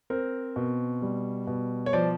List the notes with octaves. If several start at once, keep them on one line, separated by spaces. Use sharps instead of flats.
C4 A#4 C5
B2
G3
B2
C#5
F3 C5 D5